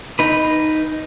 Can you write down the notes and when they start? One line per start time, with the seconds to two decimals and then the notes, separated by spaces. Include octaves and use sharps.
0.19 D#4 B4